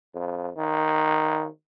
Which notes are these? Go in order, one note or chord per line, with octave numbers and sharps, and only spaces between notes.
F2
D#3